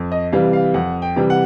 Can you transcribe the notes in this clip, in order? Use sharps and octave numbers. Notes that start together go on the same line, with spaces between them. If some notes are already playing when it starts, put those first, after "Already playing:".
Already playing: F2
D#5
C3 E3 G3 F5
F5
F2 F#5
G5
C3 E3 G3
F#5